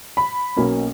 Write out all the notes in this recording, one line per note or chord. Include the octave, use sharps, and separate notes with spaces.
B5
B1 B2 A#3 C#4